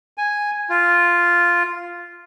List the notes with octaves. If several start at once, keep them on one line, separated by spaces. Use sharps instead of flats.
G#5
F4